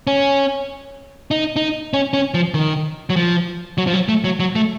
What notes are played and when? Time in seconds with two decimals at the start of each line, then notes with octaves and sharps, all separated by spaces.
0.07 C#4
1.31 D#4
1.56 D#4
1.94 C#4
2.13 C#4
2.34 F3
2.54 D#3
3.10 F#3
3.16 F3
3.78 F#3
3.87 F3
3.94 F#3
4.08 A3
4.24 F#3
4.40 F#3
4.55 A3